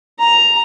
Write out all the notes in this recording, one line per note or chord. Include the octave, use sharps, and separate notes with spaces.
A#5